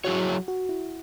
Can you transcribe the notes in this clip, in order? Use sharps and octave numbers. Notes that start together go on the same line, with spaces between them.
F#3 E4 F#4 G#4 C#5
F#4
E4